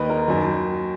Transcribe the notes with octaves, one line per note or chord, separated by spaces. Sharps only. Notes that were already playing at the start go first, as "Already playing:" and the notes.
Already playing: D#2 D#3 B4 D#5
A#4
F#2 D#3